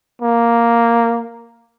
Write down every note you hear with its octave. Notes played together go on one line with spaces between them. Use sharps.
A#3